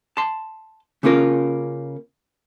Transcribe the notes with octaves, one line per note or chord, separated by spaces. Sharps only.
A5 C6
C#3 A#3 C#4 F4 A#4